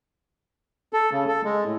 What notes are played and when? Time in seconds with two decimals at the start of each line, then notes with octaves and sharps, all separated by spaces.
0.93 A4
1.12 C#3
1.28 A4
1.45 G#3
1.65 A2